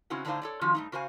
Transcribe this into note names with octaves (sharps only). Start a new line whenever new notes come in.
C#3 C4 C#4 D#4 E4 F#4
A2 D3 D4 D#4 C5 F5
A4 C#5 D5
D#3 F3 C#4 F4 F#4
G2 A3 D#4
C#3 F#4 C5 F5 G#5